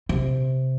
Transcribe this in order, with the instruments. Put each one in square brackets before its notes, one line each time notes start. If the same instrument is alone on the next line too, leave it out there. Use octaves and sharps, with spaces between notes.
[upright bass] C3